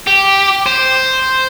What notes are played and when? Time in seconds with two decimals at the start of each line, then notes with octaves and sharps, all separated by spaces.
0.07 G4
0.66 C5